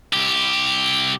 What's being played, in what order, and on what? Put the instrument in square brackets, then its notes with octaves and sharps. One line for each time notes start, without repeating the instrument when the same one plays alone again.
[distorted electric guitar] C2 G4